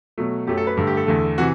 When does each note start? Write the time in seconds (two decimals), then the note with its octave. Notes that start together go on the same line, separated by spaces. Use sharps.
0.18 B2 F#3 A3
0.47 F#2 F#3 A3 G4
0.57 A4
0.67 B4
0.77 G2 D3 A3 A4
0.87 G4
0.97 A4
1.07 E2 D3 A3
1.38 C3 E3 F#4